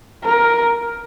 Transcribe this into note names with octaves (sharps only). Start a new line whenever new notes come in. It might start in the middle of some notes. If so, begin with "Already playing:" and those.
A#4